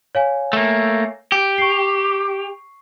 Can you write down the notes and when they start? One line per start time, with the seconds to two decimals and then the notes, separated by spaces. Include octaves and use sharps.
0.15 C#5 F5 G#5
0.53 A3 A#3
1.32 G4
1.58 C#6 C7